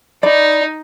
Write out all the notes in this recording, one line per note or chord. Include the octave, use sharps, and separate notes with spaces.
D#4 D5 B5